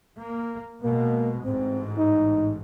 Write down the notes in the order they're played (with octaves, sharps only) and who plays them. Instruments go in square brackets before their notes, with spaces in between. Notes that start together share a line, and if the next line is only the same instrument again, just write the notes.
[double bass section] A#3
[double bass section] B2 G#3 [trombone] A#3
[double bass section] A1 G#2 [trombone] C4
[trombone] D#4